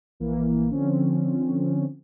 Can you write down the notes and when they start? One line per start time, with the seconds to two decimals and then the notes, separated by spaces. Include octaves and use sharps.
0.20 A#1 E3 A#3
0.71 D3 F3 C4 C#4